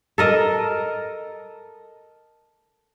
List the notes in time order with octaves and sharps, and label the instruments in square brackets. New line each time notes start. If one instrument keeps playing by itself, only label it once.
[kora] A4 A#4 D#5